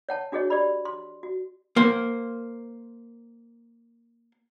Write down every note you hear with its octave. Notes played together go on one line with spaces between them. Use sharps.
C#5 F#5 A5
D4 F#4 G#4 C#5 D#5
G4 D5 B5
C6
F#4
A#3 C5